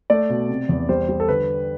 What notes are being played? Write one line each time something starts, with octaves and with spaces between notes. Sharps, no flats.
A3 D5
B2
C3
E2
G3 C5
G3
A4
D3 B4